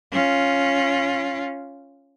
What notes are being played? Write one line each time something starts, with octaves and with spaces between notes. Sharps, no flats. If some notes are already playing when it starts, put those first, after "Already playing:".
C#4 F4